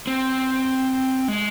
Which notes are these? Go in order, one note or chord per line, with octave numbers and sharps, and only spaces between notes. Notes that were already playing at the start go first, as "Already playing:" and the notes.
C4
G#3